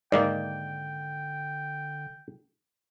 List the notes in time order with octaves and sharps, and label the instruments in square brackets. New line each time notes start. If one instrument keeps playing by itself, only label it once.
[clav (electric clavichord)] G#2 D#3 A#3 [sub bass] D3 [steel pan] D5 [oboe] G5